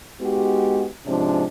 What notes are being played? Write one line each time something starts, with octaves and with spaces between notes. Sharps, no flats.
G#3 B3 D#4 F#4 G4
G#2 C3 F3 C#4 D4